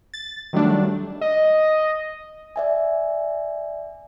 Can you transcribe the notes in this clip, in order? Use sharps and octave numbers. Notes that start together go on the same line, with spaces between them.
A6
D#3 F#3 G3 A3 D4
D#5
D5 E5 G#5